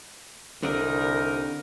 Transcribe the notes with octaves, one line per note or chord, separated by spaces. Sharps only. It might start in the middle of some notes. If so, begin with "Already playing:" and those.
C2 D3 D#4 A#4 D5